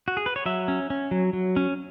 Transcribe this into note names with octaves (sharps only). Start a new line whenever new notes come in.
F#4
G#4
B4
C#5
F#3 E5
C#4
C#4
F#3
F#3
C#4